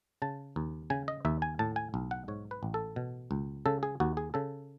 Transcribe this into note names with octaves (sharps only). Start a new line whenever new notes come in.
C#3 A5
D#2
C#3 G#5
D#5
D#2 E5
G#5
A2 A5
G#5
B1
F#5
G#2 C#5
B4
A1
A4
B2
C#2
C#3 A4
G#4
D#2 F#4
G#4
C#3 A4